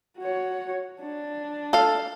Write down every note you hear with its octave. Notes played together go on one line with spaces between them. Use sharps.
F#4 C#5
D4
A4 F5